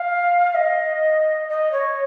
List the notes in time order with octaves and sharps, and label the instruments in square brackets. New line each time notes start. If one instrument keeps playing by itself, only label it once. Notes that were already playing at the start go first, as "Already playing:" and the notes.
Already playing: [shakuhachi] F5
D#5
D#5
C#5